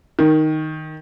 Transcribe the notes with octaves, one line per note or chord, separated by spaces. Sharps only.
D#3